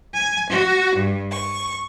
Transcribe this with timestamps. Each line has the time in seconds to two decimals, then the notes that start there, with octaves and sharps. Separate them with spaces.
0.13 G#5
0.50 F#4
0.96 G2
1.30 C#6